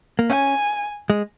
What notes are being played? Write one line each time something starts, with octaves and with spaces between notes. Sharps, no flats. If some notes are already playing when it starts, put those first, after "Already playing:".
A#3
C#4 G#5
G#3